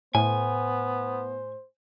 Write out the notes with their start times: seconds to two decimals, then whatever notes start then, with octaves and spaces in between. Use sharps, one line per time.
0.15 A2 B3 C5 G#5